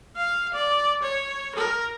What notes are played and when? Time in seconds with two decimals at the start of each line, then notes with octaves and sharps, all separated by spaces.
0.16 F5
0.54 D5
1.02 C#5
1.55 A#4